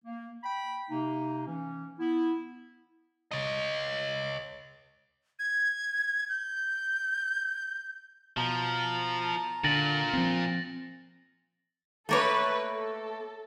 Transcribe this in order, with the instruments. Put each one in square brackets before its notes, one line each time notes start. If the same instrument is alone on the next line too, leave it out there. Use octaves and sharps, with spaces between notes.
[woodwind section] A#3
G5 B5
C3 A#3 D#4
E3 C#4
B3 E4
[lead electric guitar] C#5 D#5
[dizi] G#6
G6
[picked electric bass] B2 [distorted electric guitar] F3 [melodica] A5 A#5
[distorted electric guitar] A#2 [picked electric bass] D3 [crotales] A6 A#6 F#7
[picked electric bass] F3 C4
[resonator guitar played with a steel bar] A3 A#3 C#5 [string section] A4 B4
[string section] A4